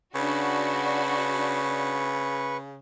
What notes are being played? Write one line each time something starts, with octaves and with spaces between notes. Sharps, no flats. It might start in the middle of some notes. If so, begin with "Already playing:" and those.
C#3 D4 F#4 B4 C#6